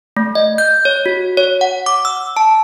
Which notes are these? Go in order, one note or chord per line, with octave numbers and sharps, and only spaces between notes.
A3
D#5
G6
C#5
F#4
C#5
F#5
D6
E6
A5